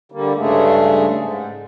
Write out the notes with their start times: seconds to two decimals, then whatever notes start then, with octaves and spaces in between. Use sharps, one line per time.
0.12 D3 G3 A#3
0.36 G2 C#3 G#3 A3
1.17 G#2